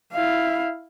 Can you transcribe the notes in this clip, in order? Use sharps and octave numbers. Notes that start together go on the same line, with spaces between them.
E4 F5